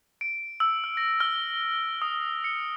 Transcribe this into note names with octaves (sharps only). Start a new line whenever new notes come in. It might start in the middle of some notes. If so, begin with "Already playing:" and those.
D7
E6
F6
A#6
F6
D#6
C#7